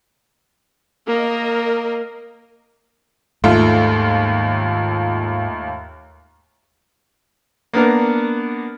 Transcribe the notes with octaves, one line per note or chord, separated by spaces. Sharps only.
A#3 A#4 D#5
D#2 G#2 A3 F4
A#3 B3 D4 A#4